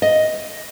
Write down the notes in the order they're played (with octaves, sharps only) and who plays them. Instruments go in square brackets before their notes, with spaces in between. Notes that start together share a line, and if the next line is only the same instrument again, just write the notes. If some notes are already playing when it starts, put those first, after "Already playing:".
[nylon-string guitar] D#5